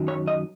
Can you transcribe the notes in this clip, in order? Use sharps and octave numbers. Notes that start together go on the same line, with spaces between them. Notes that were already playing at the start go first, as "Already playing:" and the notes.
Already playing: F#2 D#3 F#3
C#5
D#5